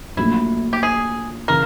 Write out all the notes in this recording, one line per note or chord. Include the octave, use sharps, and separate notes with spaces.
A#1 A#2 F#3 A3 E4
G4
G#4
C#3 E3 A#4